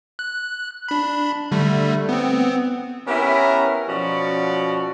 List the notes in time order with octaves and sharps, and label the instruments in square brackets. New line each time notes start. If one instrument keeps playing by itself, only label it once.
[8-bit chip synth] F#6
D4 B5
D3 G3 A3
B3 C4
[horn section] B3 C#4 E4 G4 A#4
B2 F3 C#4 F#4 D5